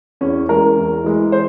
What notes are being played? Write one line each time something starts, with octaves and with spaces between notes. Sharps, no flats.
E2 C#4
E3 G#3 A#4
E2
E3 G#3
C5